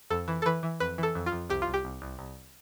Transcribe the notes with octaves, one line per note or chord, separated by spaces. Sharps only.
F2 A4
E3
A4
E3 B4
E3
F2 B4
E3 A4
F2
F4
F2
C2 G4
F4
C2
G4
C2
C2
C2